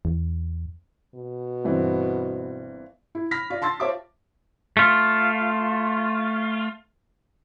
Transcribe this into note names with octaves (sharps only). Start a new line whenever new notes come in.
E2
B2
G1 E3 C4
E4
B5 F6 A#6 B6
F4 D5
A5 C6 E6 A6
F4 C5 C#5 E5 A5 D6
A3 F4